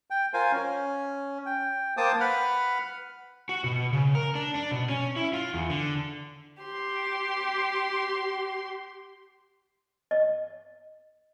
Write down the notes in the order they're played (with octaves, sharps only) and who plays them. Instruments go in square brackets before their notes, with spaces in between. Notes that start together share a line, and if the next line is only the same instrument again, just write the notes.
[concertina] G5
F4 A#4 C5 F5 G#5
C#4
G5
A#3 C5 G5 A5 D6 D#6
B4 F#5 B5 F6
[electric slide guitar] F#4
B2
C#3
A#4
D4
D4
B2
C#4
E4
F4
E2
D3
[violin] G4 C6
[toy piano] D#5